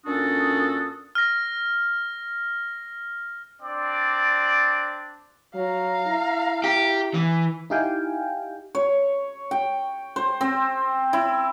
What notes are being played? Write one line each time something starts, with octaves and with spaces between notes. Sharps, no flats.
A#2 C#4 D4 F#4 A4 D#6
F6 A#6
C4 D4 D5
F#3 F5 A#5
E4
G4
E3
D#4 E4 G4 F5 G5 G#5
C#5
G5
C5
C4
E4